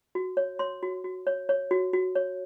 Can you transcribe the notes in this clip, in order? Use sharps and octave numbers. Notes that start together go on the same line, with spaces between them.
F#4
C#5
C#5 C6
F#4
F#4
C#5
C#5
F#4
F#4
C#5